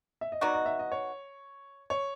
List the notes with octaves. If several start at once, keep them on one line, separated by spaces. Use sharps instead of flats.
E5
D#5
F#3 B3 D#4 F#4 D5
D#5
E5
D#5
C#5
C#5